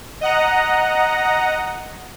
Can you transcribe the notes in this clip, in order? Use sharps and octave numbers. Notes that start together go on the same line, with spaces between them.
D#5 F#5 A#5